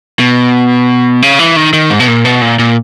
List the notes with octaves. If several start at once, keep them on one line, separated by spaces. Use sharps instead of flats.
B2
C#3
E3
D#3
D#3
G#2
B2
A#2
B2
A#2
A#2